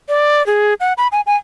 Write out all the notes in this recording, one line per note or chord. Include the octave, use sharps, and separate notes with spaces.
D5
G#4
F#5
B5
G#5
G#5